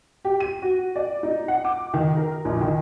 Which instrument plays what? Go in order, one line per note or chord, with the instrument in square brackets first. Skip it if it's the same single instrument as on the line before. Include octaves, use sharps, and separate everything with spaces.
[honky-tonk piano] G4
D#7
F#4
D5
D#4
F#5
D6
D#3
A#4
A#1
D#3